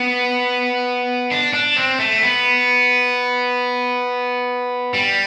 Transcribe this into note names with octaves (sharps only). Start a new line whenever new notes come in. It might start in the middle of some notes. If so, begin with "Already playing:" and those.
Already playing: B3
D4
D4
C4
A3
B3
G3